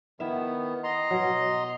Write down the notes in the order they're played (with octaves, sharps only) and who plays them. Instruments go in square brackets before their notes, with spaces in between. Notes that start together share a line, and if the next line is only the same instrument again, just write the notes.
[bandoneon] D#3 B3 [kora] E4 E5
[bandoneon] D#5 A#5 C6
[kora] B2 F#3